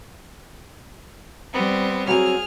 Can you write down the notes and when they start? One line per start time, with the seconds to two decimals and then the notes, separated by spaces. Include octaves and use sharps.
1.53 G3 B3 C4
2.07 F#3 C4 G#4 F6